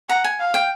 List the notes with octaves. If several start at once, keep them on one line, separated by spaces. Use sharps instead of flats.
F#5 A#5
G#5
F5
G5